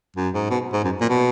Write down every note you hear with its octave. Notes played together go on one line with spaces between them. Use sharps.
F#2
G#2
B2
G#2
F#2
A#2
B2